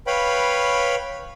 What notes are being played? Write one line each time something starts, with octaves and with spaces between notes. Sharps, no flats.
B4 C#5 F5 G5 B5